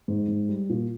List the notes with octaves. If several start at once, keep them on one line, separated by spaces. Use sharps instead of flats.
G#2
G#2
G3
A#2